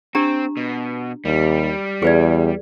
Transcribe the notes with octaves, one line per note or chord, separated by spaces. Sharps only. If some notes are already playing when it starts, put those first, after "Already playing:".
C4 D4 G4 A#5
B2
D#2 G3
E2 G#4 B4 D5